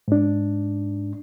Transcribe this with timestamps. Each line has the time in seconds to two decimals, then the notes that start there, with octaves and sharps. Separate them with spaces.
0.08 G#2 D4